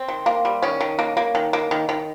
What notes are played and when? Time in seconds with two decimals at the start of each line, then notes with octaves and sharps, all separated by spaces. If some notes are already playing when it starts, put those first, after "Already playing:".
Already playing: C4
0.08 D#3
0.26 A#3
0.45 G3
0.62 D#3 C#4
0.80 D#3
0.99 A#3
1.17 A#3
1.35 D#3
1.53 A#3
1.71 D#3
1.89 D#3